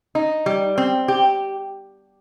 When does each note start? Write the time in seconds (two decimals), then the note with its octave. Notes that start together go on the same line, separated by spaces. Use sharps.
0.15 D#4
0.46 G3
0.78 C4
1.08 G4